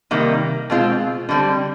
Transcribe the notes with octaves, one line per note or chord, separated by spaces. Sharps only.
C3 D#3 G3 A#3
B2 G#3 C4 F4
D3 G3 C4